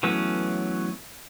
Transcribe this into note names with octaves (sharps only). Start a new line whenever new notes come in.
E3 F#3 A3 B3 C#4